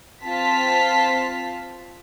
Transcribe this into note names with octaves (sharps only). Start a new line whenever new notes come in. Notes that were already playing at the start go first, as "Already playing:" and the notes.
C4 F4 A5 B6